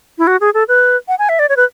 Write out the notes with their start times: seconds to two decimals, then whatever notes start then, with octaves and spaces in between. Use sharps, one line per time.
0.18 E4
0.27 F#4
0.41 G#4
0.54 A4
0.68 B4
1.08 F#5
1.19 G#5
1.29 E5
1.39 D5
1.49 C#5
1.57 B4